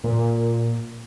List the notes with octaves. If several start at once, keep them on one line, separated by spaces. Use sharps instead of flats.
A#2